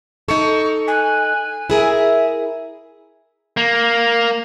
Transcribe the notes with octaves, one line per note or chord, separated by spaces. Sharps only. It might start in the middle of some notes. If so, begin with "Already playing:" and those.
D#4 A4 C#6
G#5 F#6
E4 G#4 A#4 E5
A#3